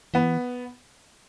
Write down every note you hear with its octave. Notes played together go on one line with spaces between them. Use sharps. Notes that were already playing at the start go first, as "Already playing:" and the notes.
E3 B3